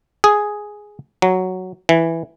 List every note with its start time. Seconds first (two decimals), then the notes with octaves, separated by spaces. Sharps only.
0.24 G#4
1.22 F#3
1.89 E3